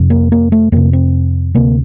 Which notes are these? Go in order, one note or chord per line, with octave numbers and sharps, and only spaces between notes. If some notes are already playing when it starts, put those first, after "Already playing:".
Already playing: F2 C3
A#3
A#3
A3
F2 C3 A#3
C4
D2 C3 A#3